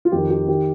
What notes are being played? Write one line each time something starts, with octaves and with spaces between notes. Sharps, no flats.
F4
F2 D#3 G4
G4
D#3 G4